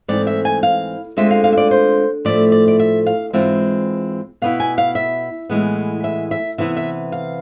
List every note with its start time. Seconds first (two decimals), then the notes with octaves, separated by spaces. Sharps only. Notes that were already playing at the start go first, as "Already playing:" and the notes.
0.08 G#2 E3 A3 C4 D5
0.27 E5
0.45 G#5
0.63 F5
1.17 D2 D3 G#3 C4 F4 E5
1.31 F5
1.44 F5
1.52 E5
1.57 D5
1.71 C5
2.25 A2 F3 A3 E4 D5
2.52 D5
2.68 D5
2.79 E5
3.06 F5
3.33 G#2 E3 G#3 C4 F4 E5
4.42 B2 B3 E4 F5
4.60 G#5
4.78 F5
4.95 E5
5.50 A2 E3 G#3 B3
6.04 E5
6.31 E5
6.58 C3 E3 B3 E4 E5
6.77 E5
7.12 F5